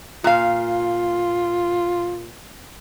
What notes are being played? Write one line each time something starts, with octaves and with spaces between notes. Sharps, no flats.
A#2 F4 F5